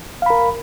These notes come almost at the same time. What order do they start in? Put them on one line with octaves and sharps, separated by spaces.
F5 B5 A#4